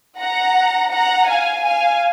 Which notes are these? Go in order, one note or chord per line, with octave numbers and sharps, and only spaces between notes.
F#5 A#5
F#5 A#5
F5 G#5
F5 G#5